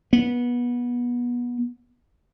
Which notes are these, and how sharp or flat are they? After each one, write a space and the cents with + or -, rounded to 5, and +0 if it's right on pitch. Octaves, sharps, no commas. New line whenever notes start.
B3 -25